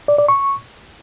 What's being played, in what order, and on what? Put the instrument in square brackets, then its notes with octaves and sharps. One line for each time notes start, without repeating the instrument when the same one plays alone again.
[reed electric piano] D5
D5
C#6